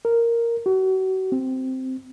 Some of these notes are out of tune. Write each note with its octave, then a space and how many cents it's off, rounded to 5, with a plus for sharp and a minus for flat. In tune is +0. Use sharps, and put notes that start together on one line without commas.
A#4 -5
F#4 +35
C4 -5